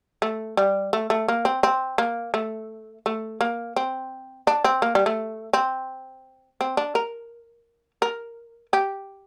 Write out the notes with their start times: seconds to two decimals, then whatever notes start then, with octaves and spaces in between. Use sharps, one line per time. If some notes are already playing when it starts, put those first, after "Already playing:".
0.22 A3
0.57 G3
0.93 A3
1.10 A3
1.28 A#3
1.45 C4
1.63 C4
1.98 A#3
2.34 A3
3.06 A3
3.41 A#3
3.76 C4
4.47 D4
4.64 C4
4.82 A#3
4.95 G3
5.06 A3
5.53 C4
6.61 C4
6.77 D4
6.95 A#4
8.02 A#4
8.73 G4